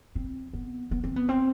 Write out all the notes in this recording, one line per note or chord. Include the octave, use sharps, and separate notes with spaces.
C4
B3
B3
C4
B3
C4